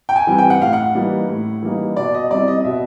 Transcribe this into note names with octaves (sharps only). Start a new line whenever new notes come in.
G5
G#5
E3 G3 C4
G5
F#5
A2 F5
F#5
E3 G3 A#3 D#4
A2
E3 G3 A#3 D#4
B2 D5
D#5
G3 C4 E4 D5
D#5
D#5
B2 E5